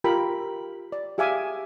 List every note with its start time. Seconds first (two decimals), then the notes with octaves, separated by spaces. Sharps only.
0.04 F4 G4 A#4 G5 B5
0.92 D5
1.18 G4 G#4 E5 F5 G#5 D6